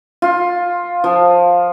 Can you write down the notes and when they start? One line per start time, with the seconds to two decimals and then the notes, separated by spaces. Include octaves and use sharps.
0.22 F4
1.04 F3